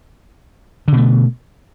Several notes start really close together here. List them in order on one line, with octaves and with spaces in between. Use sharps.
D3 B2 A3